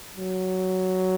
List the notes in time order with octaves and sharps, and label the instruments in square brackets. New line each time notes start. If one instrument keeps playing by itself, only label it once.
[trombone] F#3